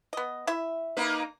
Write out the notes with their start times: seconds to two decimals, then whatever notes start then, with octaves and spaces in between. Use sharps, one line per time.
0.13 B3 D#5
0.47 E4 E5
0.97 A#3 D#4 B4